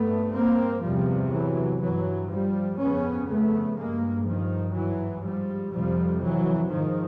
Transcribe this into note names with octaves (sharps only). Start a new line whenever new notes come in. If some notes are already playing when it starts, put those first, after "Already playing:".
Already playing: G2 A3 B3
A#3 C4
E2 C3 F3 G3
E3 F#3
G2 E3 F#3
F3 G3
F2 C#3 B3 C#4
A3 B3
G2 G#3 A#3
D#3 F3
G#2 E3 F#3
F3 G3
F2 C3 F3 G3
E3 F#3
G#2 D#3 F3